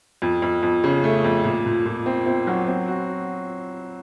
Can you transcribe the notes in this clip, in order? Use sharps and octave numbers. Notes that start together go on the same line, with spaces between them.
F2
F2
F2
C#3
A3
F2
A#2
A#2
A#2
C4
C4
F#3
C4
F#4